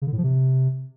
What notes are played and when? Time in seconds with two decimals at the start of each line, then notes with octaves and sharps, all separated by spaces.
0.02 C#3
0.07 D3
0.13 A2
0.18 F3
0.24 C3